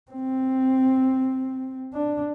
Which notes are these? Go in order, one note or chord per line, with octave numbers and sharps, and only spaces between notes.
C4
D4